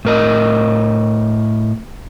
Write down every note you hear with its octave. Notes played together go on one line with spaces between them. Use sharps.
A2 A#4 D#5